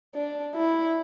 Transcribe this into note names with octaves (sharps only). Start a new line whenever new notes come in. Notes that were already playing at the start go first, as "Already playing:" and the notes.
D4
E4